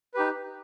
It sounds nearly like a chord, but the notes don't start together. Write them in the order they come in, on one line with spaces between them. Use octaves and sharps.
B4 G4 D#4